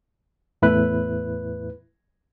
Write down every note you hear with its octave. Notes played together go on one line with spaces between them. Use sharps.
E2 A2 E4 B4 F#6